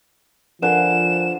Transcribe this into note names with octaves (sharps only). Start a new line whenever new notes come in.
D3 F3 A#4 B4 F5 G#5 E7